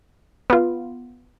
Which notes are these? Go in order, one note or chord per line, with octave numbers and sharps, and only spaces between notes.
B3 F4